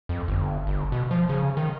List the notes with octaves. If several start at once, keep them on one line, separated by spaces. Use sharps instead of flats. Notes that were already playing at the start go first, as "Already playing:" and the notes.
F2
G1
G1
B2
F3
C#3
D#3